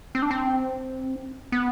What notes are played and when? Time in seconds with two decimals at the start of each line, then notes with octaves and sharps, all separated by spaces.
0.15 C4
0.22 D4
0.31 C4
1.52 B3